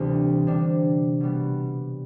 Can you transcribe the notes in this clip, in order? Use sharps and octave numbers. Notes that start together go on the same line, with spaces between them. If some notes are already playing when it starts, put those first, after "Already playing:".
Already playing: D2 C3 E3 G3 C4
C3 G3 D4
B2 G3 B3